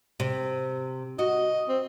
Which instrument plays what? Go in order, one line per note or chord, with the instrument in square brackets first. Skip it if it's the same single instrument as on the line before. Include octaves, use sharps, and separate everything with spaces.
[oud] C3
[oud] F#4 [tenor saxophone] D#5
[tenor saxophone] C4